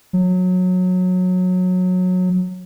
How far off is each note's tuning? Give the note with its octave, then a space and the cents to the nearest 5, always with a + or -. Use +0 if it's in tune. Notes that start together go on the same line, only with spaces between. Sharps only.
F#3 -20